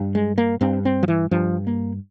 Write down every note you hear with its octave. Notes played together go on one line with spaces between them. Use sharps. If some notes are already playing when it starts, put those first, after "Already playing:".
Already playing: G2
G#3
A#3
G2 C4
C4
F3
E3
G2 F3
A#3